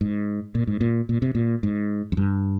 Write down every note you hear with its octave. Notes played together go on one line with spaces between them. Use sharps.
G#2
A#2
G#2
A#2
A#2
C3
A#2
G#2
F2
G2